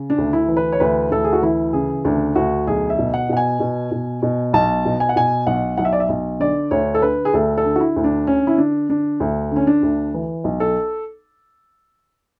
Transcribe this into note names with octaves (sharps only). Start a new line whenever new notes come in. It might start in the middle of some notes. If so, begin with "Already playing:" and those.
Already playing: C#3
D4
D2
E4
E3
B4
C#5
D2 B4
D2 A4
G#4
F#4
E3 E4
C#3 G#4
D2 D4
D2 F#4
B1 G#4
E5
B2
F#5
B2 F#5
G#5
B2
B2
B2
B1 A5
B2
G#5
F#5
B2 G#5
B1 F#5
B1 F#5
E5
D5
E5
B1
D3 D5
D2 C#5
A4
D3 B4
G#4
D2 A4
A4
D3
F#4
E4
D2
D4
D3 C#4
E4
D3 D4
D3 D4
D2
D3 C#4
D4
D2
E3
B1
A4